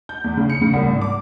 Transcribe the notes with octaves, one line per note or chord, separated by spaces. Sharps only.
G6
E2
C#3
C#7
C#3
C2
G#1
D6